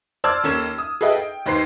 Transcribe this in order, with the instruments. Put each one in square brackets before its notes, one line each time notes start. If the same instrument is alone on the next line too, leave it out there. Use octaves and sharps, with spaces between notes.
[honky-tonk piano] C5 D5 A5 E6 F6 G#6
D#2 A#3 C#4 A4 G#6 E7
D#6
G#4 A4 B4 D#5 E5 G5
G5
D#2 D#3 B4 C5 C6 C7